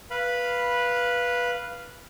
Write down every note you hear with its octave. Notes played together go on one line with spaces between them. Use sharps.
B4 F5 B5